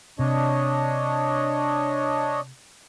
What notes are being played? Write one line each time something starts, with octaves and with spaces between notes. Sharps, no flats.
C3 D4 C#5 D#5